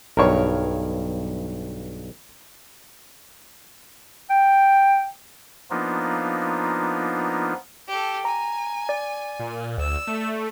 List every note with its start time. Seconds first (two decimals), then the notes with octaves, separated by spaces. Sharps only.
0.17 B1 G2 A#4 C#5
4.30 G5
5.70 F3 A#3 B3 D4 D#4 F4
7.89 G4 A4
8.25 G#5 A#5
8.89 D5
9.39 A#2
9.78 D2 E6
10.07 A3